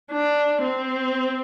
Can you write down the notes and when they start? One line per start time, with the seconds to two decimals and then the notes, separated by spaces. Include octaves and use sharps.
0.12 D4
0.63 C4